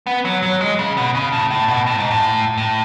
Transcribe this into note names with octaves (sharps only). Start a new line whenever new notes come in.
B3
F#3
F#3
G#3
C#3
B2
C#3
A2
A2
B2
A2
G#2
A2
A2